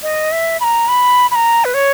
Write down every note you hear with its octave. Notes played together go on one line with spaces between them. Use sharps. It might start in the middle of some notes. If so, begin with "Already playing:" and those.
D#5
E5
B5
A#5
B5
B5
A#5
B4
C#5